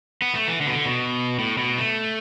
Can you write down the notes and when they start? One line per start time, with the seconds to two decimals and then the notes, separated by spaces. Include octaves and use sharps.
0.22 B3
0.35 A3
0.48 E3
0.61 D3
0.67 B2
0.73 D3
0.86 B2
1.39 A2
1.58 B2
1.78 A3